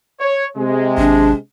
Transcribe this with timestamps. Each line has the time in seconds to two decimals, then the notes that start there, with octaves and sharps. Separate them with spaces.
0.20 C#5
0.56 C3 G#3
0.98 G#1 D4